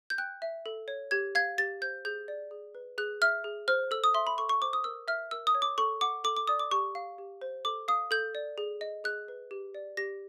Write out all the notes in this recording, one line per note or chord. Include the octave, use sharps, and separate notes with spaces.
G6
G5 F#6
E5
A4
C#5
G4 G#6
F5 G#6
G4 A6
C5 G6
G#4 G6
D5
G#4
B4
G#4 F#6
E5 F6
G#4
C5 F6
A4 E6
D#6
E5 C6
B5
A4 C#6
C#6
C5 D6
D#6
A#4 E6
E5 F6
A#4 E6
D#6
C#5
D6
A4 C#6
F#5 D6
A4 D6
D6
D5 D#6
D6
G4 C#6
F5
G4
C5
A4 D6
F5 D#6
A4 G6
D5
G#4
D#5
G#4 F#6
B4
G4
D5
G4 A#6